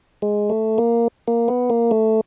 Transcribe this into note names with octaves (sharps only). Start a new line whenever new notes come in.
G#3
A3
A#3
A#3
B3
A#3
A3